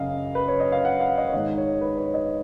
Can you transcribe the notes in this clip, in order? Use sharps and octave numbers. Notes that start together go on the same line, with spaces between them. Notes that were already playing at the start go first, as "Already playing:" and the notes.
Already playing: F#2 C#3 D#5 F5
B4
C#5
D#5
F5
F#5
F5
D#5
C#5
G#2 D#3 D#5
C#5
B4
C#5
D#5